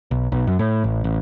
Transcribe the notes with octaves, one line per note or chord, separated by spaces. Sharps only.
B1
B1
F#2
A2
A1
A1